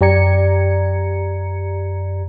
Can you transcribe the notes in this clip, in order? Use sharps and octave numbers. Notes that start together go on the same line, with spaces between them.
F#2 G4 D5 A#5 G#6 C#7